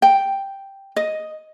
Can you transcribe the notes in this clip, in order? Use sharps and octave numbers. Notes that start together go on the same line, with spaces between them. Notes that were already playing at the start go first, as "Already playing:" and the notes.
G5
D#5